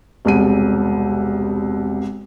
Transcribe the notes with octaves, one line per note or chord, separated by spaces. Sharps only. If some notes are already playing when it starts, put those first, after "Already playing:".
E1 C2 D#7